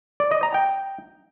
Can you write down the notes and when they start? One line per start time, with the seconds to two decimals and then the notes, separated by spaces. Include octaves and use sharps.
0.20 D5
0.31 D#5
0.43 A#5
0.54 G5